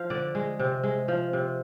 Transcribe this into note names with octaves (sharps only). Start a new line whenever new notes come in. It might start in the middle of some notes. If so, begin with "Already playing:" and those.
Already playing: F3 F5
D3 D5
G#3
C3
G#3
F3
C3